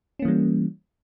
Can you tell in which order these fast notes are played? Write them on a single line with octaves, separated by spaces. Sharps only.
C#4 A#3 E3 G3